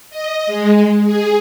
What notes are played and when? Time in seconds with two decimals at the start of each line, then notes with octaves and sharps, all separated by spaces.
0.10 D#5
0.47 G#3
1.04 G#4